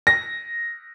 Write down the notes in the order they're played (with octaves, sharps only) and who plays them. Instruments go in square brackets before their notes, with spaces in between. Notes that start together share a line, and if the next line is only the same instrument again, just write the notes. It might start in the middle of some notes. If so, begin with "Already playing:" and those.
[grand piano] A#6